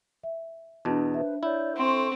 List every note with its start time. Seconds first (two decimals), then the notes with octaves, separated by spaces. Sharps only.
0.23 E5
0.85 E2 B2 D4 A5
1.14 D4 B4 C5 E5
1.43 E4 C#5 D5 G6
1.77 C4 A4 C6 C#6